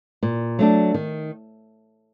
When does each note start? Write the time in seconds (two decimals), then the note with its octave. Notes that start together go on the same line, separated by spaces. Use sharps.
0.23 A#2
0.59 F#3 A3 D4
0.94 D#3